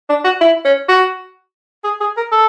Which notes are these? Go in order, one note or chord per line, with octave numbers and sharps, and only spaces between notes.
D4
F#4
E4
C#4
F#4
G#4
G#4
A#4
A4